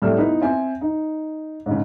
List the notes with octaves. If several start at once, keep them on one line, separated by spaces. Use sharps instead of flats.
A2 C3 G3 A3 E6 F6
B3 D#4 E4 B4
C4 E5 G#5
D#4
G#2 C#3